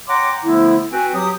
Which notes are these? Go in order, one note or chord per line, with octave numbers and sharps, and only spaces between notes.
C#5 F#5 G5 A#5 C6 D6
D3 F3 A3 B3 E4
C4 F#4 B4 G5 G#5
F#3 G4 D#6